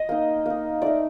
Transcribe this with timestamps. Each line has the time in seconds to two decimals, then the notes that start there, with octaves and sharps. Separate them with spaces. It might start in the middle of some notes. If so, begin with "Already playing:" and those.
Already playing: D#5
0.09 A#3 D#4
0.46 A#3 D#4
0.82 A3 D#4 D5